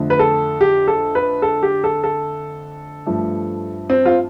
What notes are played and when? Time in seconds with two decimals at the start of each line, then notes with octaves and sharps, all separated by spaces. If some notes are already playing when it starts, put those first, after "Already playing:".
Already playing: F2 D3 A3
0.10 B4
0.19 A4
0.61 G4
0.88 A4
1.15 B4
1.42 A4
1.63 G4
1.84 A4
2.04 A4
3.06 G2 F3 A3
3.90 C4
4.06 F4